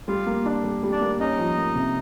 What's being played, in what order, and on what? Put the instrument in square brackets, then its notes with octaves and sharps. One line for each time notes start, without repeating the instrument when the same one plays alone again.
[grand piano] G3 [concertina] F4 F5
[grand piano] A#3
D4
G3
G3
[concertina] D4 D5
[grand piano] A#3
[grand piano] C#4 [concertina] D#4 D#5
[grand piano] F3
A#3
C3